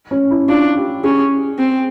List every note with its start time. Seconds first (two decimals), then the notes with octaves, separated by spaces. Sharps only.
0.11 C#4
0.31 E4
0.48 D4 F4
0.76 G4
1.04 C#4 G#4
1.59 C4